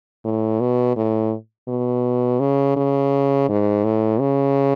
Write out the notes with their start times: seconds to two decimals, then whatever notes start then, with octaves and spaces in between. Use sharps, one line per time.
0.25 A2
0.60 B2
0.96 A2
1.68 B2
2.40 C#3
2.77 C#3
3.49 G#2
3.84 A2
4.20 C#3